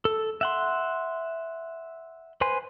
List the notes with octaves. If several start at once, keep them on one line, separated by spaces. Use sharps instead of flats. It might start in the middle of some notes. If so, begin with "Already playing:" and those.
A4
E5 F#5 C6
B4 C5 G#5 C6